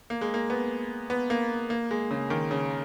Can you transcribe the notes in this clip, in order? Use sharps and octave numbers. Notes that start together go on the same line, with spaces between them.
A#3
G#3
A#3
B3
B3
A#3
A#3
G#3
C#3
D#3
C#3